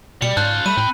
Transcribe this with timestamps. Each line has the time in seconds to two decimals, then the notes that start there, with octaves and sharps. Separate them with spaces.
0.22 B2 G3 D5 C#7
0.37 G#2 C#3 F4 A5 F#6 G6
0.66 G3 A3 B5 D#7
0.77 A2 C4 G5